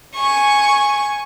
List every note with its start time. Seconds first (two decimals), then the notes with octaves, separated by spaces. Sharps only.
0.15 G#5 C#6